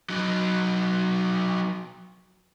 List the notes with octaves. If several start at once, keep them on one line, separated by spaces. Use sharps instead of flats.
F#3 D#4